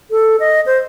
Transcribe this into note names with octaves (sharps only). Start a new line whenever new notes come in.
A4
D#5
C5